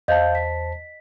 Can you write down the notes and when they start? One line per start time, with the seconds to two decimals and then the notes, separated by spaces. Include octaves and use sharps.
0.08 E2 C5 D#5 F5 A5 G6
0.35 B6